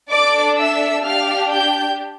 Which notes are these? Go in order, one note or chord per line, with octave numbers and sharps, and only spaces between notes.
D4 A4 D5 D6
E5 E6
D4 G4 F5 F6
G5 G6